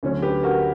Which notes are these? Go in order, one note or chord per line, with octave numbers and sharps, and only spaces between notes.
D2 D3 F#3 C#4
G4 B4
F#4 A#4